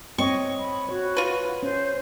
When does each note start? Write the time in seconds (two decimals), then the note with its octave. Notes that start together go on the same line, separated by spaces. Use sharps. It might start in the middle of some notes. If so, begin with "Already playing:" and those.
0.18 C4 C#5 D#5 C#6
0.59 B5
0.89 F#4 C#5
1.17 F4 B4
1.63 C#4 C5